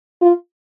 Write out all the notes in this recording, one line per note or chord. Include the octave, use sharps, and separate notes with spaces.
F4